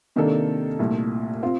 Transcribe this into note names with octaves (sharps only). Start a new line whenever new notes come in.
C3 D#3 A#3 D4 A4
C2 A#2 A3
C4 F4